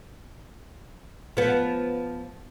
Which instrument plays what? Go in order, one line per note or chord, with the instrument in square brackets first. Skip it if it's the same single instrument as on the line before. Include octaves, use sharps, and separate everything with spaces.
[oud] F3 B3